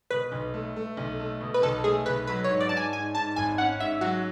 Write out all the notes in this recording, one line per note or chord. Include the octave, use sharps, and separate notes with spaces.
B2 B4
B1
A3
A3
B1
A3
B2
B4
B1 A4
A3 G#4
B1 B4
F#3 B4
C#5
G#2
D5
A5
G#2 G#5
G#2 G#5
G#2 A5
G#1 G#5
C#4 F#5
G#2 E5
F#3 F#4